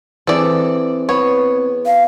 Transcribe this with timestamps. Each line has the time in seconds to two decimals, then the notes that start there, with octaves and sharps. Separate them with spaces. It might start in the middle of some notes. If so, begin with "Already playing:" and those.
0.27 E3 C4 G#4 A4 D5
1.09 B3 C#5
1.86 F5